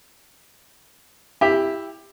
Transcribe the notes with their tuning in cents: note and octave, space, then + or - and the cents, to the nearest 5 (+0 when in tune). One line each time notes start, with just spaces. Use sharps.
E4 +0 G4 +10